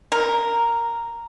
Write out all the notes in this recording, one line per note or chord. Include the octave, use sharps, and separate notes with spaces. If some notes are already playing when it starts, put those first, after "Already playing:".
A#4